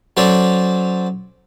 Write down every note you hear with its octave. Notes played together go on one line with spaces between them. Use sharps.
F#3 C#4 A4 C5 D5